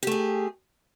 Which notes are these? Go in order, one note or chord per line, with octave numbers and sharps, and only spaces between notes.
A3 G4 G#4